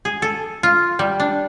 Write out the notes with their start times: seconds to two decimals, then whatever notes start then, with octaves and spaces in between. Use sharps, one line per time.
0.05 G#4
0.22 A4
0.63 F4
0.99 G3
1.20 D4